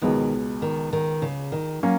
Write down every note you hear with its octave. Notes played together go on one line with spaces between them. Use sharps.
C#2 B2 D#3 G#3 B3
D#3
D#3
C#3
D#3
F#3 A#3 C#4